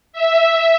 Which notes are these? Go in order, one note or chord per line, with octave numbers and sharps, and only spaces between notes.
E5